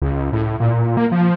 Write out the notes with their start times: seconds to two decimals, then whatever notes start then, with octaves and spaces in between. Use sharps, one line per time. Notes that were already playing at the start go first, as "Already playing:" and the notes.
0.02 C#2
0.33 A2
0.60 A#2
0.97 A#3
1.12 F3